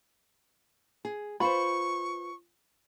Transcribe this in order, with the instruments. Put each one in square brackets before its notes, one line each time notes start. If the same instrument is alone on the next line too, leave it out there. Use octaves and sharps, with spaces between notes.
[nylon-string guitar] G#4
[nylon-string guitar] F4 B4 C5 [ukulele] B5 [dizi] C#6